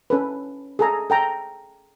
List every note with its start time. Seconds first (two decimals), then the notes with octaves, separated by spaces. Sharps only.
0.10 C#4 A4 B4
0.79 G#4 A4 A#5
1.10 A4 G5 A#5